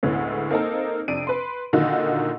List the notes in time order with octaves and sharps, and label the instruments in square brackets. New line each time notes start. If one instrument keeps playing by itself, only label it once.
[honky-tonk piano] D2 A2 D3 G#3 B3 C#4
A#3 C4 D#4 A4 A#4
F2 C3 D4 D7 D#7
B4 C6
A#2 D3 D#3 D#4 F4 F#4